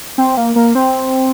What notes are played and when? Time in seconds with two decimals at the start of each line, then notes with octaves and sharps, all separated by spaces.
0.18 C4
0.37 A#3
0.56 A#3
0.75 C4